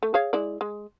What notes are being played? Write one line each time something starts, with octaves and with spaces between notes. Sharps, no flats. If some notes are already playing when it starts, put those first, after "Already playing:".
A3
G#4 C#5 F5
G#3 E4 D5
G#3